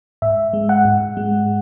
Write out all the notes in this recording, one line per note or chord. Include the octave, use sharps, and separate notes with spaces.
G#2 E5
G#3
F#5
G#2
G#3